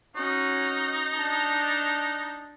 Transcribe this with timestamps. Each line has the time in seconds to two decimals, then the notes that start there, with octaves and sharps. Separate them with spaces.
0.16 C#4 D#4 F#4
1.16 D4 A5